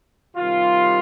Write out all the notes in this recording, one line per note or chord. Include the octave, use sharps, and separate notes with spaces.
C3 D#3 G3 F4